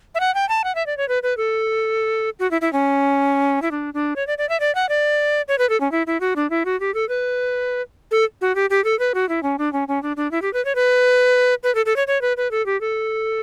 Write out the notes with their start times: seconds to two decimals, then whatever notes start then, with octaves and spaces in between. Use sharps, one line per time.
0.15 E5
0.20 F#5
0.34 G5
0.49 A5
0.64 F#5
0.75 E5
0.86 D5
0.97 C#5
1.09 B4
1.23 B4
1.37 A4
2.39 F#4
2.51 E4
2.61 E4
2.73 C#4
3.62 E4
3.71 D4
3.94 D4
4.16 C#5
4.27 D5
4.38 D5
4.49 E5
4.60 D5
4.75 F#5
4.89 D5
5.48 C#5
5.58 B4
5.70 A4
5.80 C#4
5.92 E4
6.07 E4
6.20 F#4
6.36 D4
6.50 E4
6.65 F#4
6.80 G4
6.94 A4
7.09 B4
8.11 A4
8.41 F#4
8.55 G4
8.70 G4
8.84 A4
8.99 B4
9.14 F#4
9.29 E4
9.43 C#4
9.58 D4
9.73 C#4
9.88 C#4
10.03 D4
10.17 D4
10.31 E4
10.42 G4
10.53 B4
10.65 C#5
10.75 B4
11.63 B4
11.75 A4
11.86 A4
11.96 C#5
12.07 C#5
12.21 B4
12.37 B4
12.51 A4
12.66 G4
12.81 A4